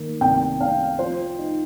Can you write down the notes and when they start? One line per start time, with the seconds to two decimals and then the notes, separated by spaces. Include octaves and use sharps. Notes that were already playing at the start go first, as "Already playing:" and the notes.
Already playing: D#3 A#3
0.20 C2 G5
0.60 C3 F5
0.99 F3 C5
1.38 D#4